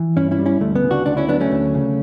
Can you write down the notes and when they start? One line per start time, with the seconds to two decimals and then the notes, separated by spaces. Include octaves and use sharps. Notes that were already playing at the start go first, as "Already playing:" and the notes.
Already playing: E3
0.16 G2 C#4 E4
0.31 C#4 E4
0.38 G3
0.46 C#4 E4
0.60 D2 A3
0.75 B3
0.84 C#3
0.91 D4 F#4
1.06 D2 D4 F#4
1.17 C#4 E4
1.28 F#3 B3 D4
1.40 A3 C#4
1.51 D2
1.74 C#3